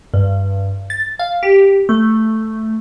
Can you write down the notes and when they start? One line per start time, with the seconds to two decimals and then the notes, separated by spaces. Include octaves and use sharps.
0.14 G2
0.90 A6
1.19 F5
1.43 G4
1.89 A3